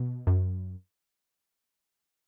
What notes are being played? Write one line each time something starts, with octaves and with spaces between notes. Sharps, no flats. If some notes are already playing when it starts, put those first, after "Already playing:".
Already playing: B2
F#2